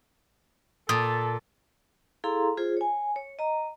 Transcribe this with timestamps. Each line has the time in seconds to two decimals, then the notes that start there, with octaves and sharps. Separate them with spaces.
0.89 A#2 A4 D#6
2.24 E4 G#4 A4 F5 A#5 C6
2.57 F4 G#4 C5
2.77 C#5 G#5
3.16 C#5
3.39 D#5 A#5